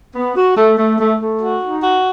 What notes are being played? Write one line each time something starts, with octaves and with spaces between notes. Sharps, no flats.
B3
F#4
A3
A3
A3
A3
F#4
D#4
F#4